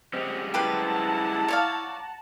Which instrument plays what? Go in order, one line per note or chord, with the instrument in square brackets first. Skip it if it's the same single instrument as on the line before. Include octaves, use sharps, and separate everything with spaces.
[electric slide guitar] G3 G#3 C#4 [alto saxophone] C4 [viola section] D#5 F#5
[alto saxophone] E4 [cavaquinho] G4 B4 C5 [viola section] F#5 A5 A#5
[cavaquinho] C#5 D5 F5